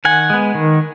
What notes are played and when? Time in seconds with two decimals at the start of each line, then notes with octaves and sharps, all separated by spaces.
0.05 D#3 F#5 G#5
0.30 G#3 B3
0.55 D#3